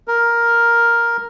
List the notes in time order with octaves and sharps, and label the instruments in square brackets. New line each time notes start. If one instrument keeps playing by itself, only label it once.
[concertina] A#4